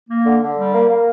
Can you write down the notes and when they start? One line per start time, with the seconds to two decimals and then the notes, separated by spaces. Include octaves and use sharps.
0.09 A#3
0.25 D3
0.42 D3
0.58 G3
0.74 A#3
0.90 A#3